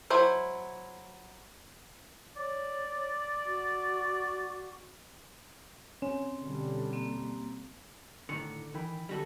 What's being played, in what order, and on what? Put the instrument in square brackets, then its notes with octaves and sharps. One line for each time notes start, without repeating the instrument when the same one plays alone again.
[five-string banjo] F#3 E4 C5
[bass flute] C#5 [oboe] D5
[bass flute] F#4
[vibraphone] C4 [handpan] C#4
[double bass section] B2 D3 G3
[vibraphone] A#3 C4
[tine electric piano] A2 C#7 [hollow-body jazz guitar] D3 D#3
[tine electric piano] D#3 G5 B5 [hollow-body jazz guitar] E3
[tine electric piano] D3 [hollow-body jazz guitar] G3 F#4 A4